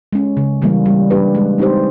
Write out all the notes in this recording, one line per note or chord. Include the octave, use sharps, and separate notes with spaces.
G#3 C#4
C#3
E3 G3 A#3
G3
A#3 D4 G4 B4
G#3
C4 D#4 G4 C5